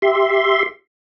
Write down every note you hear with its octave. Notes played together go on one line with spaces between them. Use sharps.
G4 E5 C6